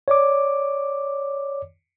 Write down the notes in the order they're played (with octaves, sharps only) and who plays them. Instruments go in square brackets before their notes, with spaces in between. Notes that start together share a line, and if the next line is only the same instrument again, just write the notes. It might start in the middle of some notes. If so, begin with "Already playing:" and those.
[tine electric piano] C#5 D5 D6